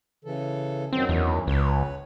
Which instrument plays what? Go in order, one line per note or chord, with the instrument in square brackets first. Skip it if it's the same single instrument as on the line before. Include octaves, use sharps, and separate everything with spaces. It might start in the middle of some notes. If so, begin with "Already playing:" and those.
[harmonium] C#3 E3 A4
[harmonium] F#2 D#3 F#3 [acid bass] C4
[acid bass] E2
[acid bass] C#2 [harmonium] B4 C#5